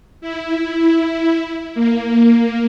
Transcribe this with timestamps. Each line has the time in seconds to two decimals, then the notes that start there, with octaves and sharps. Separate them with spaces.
0.21 E4
1.75 A#3